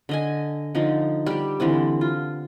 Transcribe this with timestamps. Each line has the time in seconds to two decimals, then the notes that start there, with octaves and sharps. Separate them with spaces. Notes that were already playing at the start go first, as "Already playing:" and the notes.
0.09 D3 D#5 G#5
0.75 D3 F3 D#4
1.26 G3 G4
1.60 D3 E3 B3 C4
2.01 F4